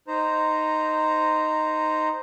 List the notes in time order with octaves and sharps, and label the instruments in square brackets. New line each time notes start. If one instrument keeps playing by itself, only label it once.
[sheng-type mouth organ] D#4 C5 A#5